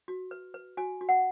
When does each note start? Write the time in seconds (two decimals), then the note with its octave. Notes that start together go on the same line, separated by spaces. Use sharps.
0.08 F#4
0.31 B4
0.54 B4
0.77 F#4 G#5
1.01 F#4
1.09 F#5